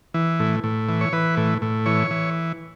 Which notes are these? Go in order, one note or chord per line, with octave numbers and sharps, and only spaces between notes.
E3
A2
A2
E3
C#5
E3 B4
A2
A2
E3 C#5
E3